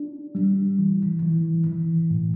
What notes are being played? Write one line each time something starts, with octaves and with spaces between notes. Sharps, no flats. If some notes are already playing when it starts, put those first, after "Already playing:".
Already playing: D4
G3
E3
E3
E3
A2